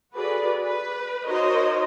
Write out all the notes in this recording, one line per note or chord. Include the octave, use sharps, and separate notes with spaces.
F#4 G#4 A4 B4 D5
B4
D#4 F#4 A#4 C5 C#5 D#5